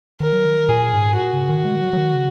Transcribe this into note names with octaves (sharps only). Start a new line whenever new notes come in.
D#3 A#4
F#3
D#3
A#2 G#4
G#2
A#2 F#4
C#3
D#3
G#3
D#3
F#3
F#3
D#3
C#3